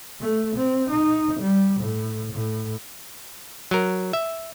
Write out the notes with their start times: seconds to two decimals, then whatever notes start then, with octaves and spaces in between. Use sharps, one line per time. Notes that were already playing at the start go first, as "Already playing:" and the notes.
0.20 A3
0.55 C4
0.90 D#4
1.40 G3
1.81 A2
2.33 A2
3.71 F#3 A#4
4.13 E5